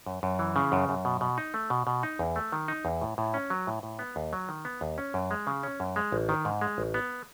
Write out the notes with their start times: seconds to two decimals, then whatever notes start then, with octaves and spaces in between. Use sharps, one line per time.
0.06 F#2
0.23 F#2
0.39 E3
0.56 C#3
0.72 F#2
0.89 F#2
1.05 B2
1.21 B2
1.38 D#4
1.54 A3
1.70 B2
1.87 B2
2.03 D#4
2.19 E2
2.36 A3
2.52 D#3
2.68 D#4
2.85 E2
3.01 A2
3.18 A2
3.34 C#4
3.50 F#3
3.67 A2
3.83 A2
3.99 B3
4.16 D#2
4.33 F#3
4.49 D#3
4.65 B3
4.81 D#2
4.98 C#4
5.14 F#2
5.31 G#3
5.47 C#3
5.63 C#4
5.80 F#2
5.96 G#3
6.12 A1
6.29 D#3
6.45 G#2
6.61 G#3
6.78 A1
6.94 B3